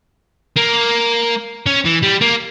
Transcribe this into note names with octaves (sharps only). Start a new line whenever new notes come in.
A#3
C#4
E3
G3
A#3